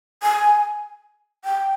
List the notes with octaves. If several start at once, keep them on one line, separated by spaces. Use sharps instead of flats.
G#5
G5